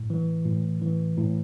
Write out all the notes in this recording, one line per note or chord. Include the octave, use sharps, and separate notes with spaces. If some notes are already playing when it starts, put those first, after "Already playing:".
Already playing: A2
E3
A2
E3
A2